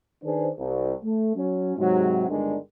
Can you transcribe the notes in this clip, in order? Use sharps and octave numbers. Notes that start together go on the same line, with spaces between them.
D#3 D4 G#4 B4 C5
C2
A3
F#3 C#4
G#2 C3 F#3
G1 D#3 G#3 D4